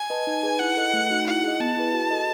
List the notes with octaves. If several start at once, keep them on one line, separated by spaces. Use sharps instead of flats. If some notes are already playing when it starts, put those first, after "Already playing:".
Already playing: G#5
B4 D#5 A5
D#4
G#4 B4
E4 F#5
A4 D#5
A3
D#4 F#4
E4 F#5
G#4 D#5
B3 A5
E4 G#4 B4
F#4
A4 D#5